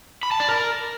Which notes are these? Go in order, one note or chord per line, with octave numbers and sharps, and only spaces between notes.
B5
A5
D5
A#4